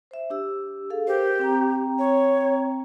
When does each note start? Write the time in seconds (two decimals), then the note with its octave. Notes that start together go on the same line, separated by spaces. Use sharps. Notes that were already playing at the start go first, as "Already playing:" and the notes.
0.11 C5 E5
0.30 D4 G4 E6
0.90 G#4 A4 F5
1.07 G4 A#4 C5
1.39 C4 G5 A#5
1.99 C#5